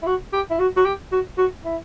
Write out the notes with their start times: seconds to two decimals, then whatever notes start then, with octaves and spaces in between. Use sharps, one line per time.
0.02 E4
0.07 F#4
0.33 G4
0.50 E4
0.59 F#4
0.77 F#4
0.85 G4
1.12 F#4
1.38 F#4
1.64 E4